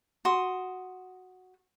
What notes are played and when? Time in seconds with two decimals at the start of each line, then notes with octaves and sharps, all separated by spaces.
0.25 F#4 C6 D#6